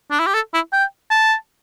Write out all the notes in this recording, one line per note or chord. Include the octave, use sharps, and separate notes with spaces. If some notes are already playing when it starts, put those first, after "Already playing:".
D4
E4
G4
A4
E4
G5
A5